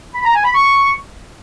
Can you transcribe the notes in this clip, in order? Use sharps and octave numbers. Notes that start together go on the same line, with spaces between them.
B5
A#5
G#5
B5
C#6